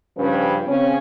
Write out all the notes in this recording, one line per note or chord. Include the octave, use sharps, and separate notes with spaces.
G2 C#3 F3 C#4 B4
C#3 C4 C#4